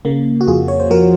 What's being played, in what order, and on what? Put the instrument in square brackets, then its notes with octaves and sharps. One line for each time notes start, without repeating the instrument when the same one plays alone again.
[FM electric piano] C#3 A#3
F#4
F2 F4 G#4
C#5
C5
F3 F#4 A#4